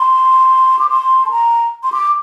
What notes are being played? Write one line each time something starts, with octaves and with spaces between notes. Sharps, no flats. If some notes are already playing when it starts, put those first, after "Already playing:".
Already playing: C6
D6
C6
A5
A#5
C6
D6